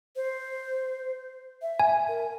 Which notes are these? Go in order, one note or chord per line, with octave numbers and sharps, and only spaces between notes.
C5
E5
G#5
A#4